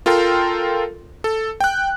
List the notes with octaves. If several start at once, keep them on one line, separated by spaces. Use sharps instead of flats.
F4 A4 A#4 G5 C6
A4
G5 F#6